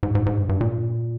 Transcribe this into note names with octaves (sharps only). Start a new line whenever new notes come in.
G#2
G#2
G#2
G2
G2
A#2